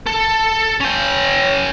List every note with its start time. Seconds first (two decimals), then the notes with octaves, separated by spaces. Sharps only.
0.06 A4
0.80 C#4 G5